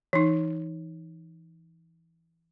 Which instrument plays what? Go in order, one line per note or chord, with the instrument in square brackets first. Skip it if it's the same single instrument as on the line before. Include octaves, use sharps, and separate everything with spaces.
[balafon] E3 D#4